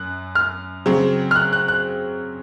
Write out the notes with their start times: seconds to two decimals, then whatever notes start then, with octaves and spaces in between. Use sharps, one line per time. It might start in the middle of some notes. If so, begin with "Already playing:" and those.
Already playing: F#2 F#6
0.35 F6
0.86 C#3 F#3 C4
1.31 F6
1.36 F#6
1.53 F#6
1.68 F#6